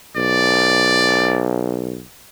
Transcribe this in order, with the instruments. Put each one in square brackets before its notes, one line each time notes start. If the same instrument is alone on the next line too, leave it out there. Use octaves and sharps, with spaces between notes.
[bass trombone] B1 [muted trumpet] D5